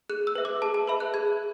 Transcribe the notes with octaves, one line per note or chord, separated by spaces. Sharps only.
G#4 F#6
E6
B4 E5
D6
G#4 A5
A5
B4 E5 B5
F#6
G#4 G#6